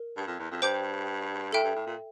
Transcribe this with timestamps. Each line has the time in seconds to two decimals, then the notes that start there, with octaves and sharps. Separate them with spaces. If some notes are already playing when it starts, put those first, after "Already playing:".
Already playing: A#4
0.17 G2
0.27 F2
0.39 E2
0.51 F2
0.62 G2 C5 G5 D6 G6
1.53 A2 A4 E5 G5
1.64 G2
1.75 A2
1.86 A#2